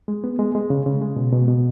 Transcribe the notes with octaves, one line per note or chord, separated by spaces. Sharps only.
G#3
B3
G#3
G#3
C#3
C#3
G#3
B2
B2
B2